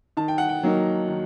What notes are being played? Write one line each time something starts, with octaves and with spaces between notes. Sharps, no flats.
D#3 A5
G5
F#5
G5
F#3 A#3 D#4
D#3